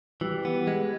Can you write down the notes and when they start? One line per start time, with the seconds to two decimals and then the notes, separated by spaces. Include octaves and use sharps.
0.21 E3 G3
0.45 B3
0.67 G#3